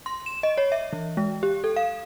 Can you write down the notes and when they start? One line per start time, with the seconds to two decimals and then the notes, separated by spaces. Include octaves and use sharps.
0.06 C6
0.26 E7
0.43 D#5
0.58 C#5
0.72 E5
0.93 E3
1.17 G#3
1.43 G4
1.64 A4
1.76 F5